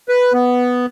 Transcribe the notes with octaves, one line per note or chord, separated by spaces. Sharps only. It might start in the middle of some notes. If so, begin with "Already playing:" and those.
B4
B3